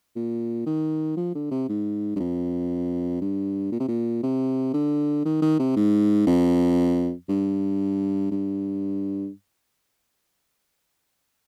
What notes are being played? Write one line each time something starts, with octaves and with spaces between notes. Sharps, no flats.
A#2
D#3
F3
D3
C3
G#2
G2
F2
G2
A#2
C3
A#2
C3
D3
D#3
D#3
C3
G#2
F2
G2
G2